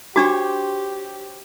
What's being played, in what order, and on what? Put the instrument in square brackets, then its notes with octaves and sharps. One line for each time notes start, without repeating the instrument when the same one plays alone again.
[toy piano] D4 F#4 [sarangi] G4 [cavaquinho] C5 C#5 D6